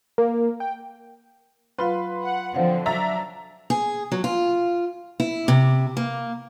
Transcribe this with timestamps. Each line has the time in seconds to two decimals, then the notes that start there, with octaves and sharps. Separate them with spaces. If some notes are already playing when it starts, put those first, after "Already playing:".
0.18 A#3
0.60 G5
1.78 F#3 F4 B4 F5 C6
2.22 F#5
2.55 D3 F3 C4 C5 F5 F#5
2.86 F#3 D4 E5 A#5 A6
3.70 G#4
4.12 F#3
4.24 F4
5.20 E4
5.48 C3
5.97 A#3